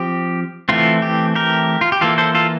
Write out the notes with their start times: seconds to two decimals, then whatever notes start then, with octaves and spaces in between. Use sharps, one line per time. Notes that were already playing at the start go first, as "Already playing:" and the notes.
Already playing: F3 C4 G4
0.69 E3 A3 C4 F4
1.02 G4
1.35 G4 A#4
1.81 F4
1.92 G4
2.01 E3 A#3 F4 A4
2.18 A4 C5
2.35 F4 A4